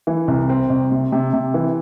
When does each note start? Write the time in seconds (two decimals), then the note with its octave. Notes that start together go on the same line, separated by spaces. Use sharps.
0.07 E3
0.28 C2
0.49 C4
0.70 C2
0.91 C3
1.12 C3
1.33 C3
1.54 E3